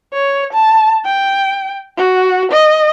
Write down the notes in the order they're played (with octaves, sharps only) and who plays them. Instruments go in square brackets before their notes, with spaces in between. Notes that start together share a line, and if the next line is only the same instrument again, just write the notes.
[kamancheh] C#5
A5
G5
F#4
D#5